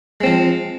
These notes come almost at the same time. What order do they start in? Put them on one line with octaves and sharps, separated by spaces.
G#3 C4 F3